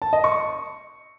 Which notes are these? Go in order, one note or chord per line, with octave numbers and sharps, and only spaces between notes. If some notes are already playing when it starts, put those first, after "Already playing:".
A5
D#5
C#6